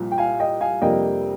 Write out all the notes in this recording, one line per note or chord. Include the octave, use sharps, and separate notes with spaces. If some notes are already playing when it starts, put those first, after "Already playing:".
Already playing: C2 A#2 F3
G5
F5 G#5
D#5 G5
F5 G#5
F2 C3 G3 A#3 D4 D#5 G5